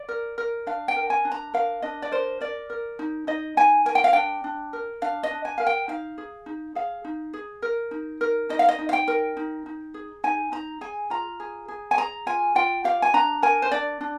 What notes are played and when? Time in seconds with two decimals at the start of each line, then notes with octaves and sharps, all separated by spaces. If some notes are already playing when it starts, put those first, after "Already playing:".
Already playing: D5
0.09 A#4
0.38 A#4
0.67 D4 F5
0.88 G5
0.96 A#4
1.10 G#5
1.25 D4
1.32 A#5
1.54 A#4 F5
1.82 D4 D#5
2.02 D5
2.11 A#4 C5
2.41 A#4 D5
2.70 A#4
2.99 D#4
3.27 D#4 D#5
3.57 D#4 G#5
3.85 A#4 G#5
3.95 G5
4.04 F5
4.13 D4 G5
4.44 D4
4.73 A#4
5.02 D4 F5
5.23 D#5
5.31 D4
5.45 G#5
5.58 A#4 F5
5.67 G5
5.88 D#4 F5
6.18 G#4
6.46 D#4
6.75 G#4 F5
7.05 D#4
7.33 G#4
7.62 A#4
7.91 D#4
8.21 A#4
8.49 D#4 D#5
8.59 F5
8.69 D#5
8.78 D#4
8.89 F5
8.93 G5
9.08 A#4
9.37 D#4
9.66 D#4
9.94 G#4
10.24 D#4 G#5
10.52 D#4 A#5
10.81 G#4 G#5
11.10 F4 A#5
11.40 G#4
11.68 G#4
11.91 G#5
11.97 G#4 A#5
12.26 F4 G#5
12.55 F4 G5
12.84 G4 F5
13.02 G#5
13.14 D4 A#5
13.42 A#4 G#5
13.62 C5
13.71 D4 D5
14.01 D4